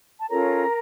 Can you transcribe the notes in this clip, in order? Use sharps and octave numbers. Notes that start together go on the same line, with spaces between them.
A5
C#4 F4 A4 A#4 C#5 A#5